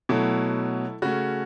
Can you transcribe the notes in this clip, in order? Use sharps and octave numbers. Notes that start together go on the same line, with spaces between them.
B2 F#3 A3 E4 A4
C#3 A3 C#4 F#4